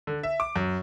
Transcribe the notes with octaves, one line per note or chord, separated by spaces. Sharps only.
D3
E5
D6
F#2